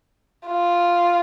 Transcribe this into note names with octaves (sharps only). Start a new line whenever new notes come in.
F4